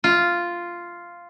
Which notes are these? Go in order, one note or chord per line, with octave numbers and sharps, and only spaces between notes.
F4